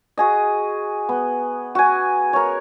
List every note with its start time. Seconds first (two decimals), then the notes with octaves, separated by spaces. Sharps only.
0.17 F#4 G#4 D#5
1.09 B3
1.75 F#4 G#5
2.33 A#4 C#5